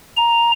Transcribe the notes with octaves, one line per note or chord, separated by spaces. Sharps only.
A#5